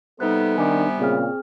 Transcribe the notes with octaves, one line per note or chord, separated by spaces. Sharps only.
C3 G3 B3 D#4 A4 B4 F#6
D#3 D4 G#5 D6 F#6
A#2 C#3 C4 G#4 F6